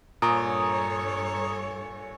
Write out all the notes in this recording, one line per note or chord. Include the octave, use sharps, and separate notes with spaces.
G2 A#2 A4 C#5 G#5 A#5 C#6 D#6